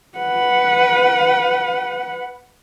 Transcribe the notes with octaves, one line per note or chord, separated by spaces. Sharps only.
B4 F#5